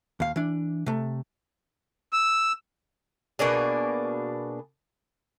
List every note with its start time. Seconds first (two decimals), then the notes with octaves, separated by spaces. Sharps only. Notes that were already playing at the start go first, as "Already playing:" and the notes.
0.20 D#2 F5
0.36 E3 D4
0.86 C3 A3
2.13 E6
3.39 B2 A#3 D4 G#4